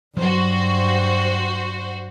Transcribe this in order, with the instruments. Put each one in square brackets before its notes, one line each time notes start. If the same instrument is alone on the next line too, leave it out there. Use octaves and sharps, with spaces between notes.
[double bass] G2 [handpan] F#3 [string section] F#4 C5